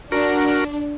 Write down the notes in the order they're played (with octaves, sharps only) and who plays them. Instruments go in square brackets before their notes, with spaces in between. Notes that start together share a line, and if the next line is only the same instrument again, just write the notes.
[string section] D4 [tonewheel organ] F#4 A#4